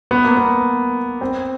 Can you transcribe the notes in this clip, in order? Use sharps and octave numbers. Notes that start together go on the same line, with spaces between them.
B3
A#3
B3
C4